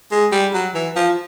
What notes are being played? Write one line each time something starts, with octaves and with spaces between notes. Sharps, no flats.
G#3
G3
F#3
E3
F3